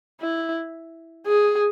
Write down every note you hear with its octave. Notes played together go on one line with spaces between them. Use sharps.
E4
G#4